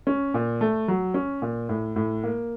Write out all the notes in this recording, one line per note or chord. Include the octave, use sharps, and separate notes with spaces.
C#4
A#2
A3
F#3
C#4
A#2
A2
A2
A#3